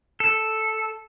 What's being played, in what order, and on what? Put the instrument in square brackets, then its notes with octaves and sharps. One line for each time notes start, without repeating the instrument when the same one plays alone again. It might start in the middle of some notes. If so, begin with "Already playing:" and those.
[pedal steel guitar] A4